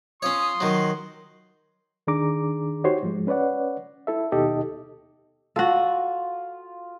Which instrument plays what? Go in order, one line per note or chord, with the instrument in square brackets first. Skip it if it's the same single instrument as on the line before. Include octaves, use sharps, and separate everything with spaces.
[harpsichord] C#4 C#5 [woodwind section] F4 D#6 [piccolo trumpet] C6
[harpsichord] D#3 F#3
[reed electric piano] D#2 D#3 D4 G#4 A#5 D6
D#4 F#4 G4 C5 C#5 C6
G#2 F3 G#3
C#4 B4 C#5 D5 F#5
E4 A4 E5
D#2 B2 D#4 G4 A4 D#5
[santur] F4 [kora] F#4 A4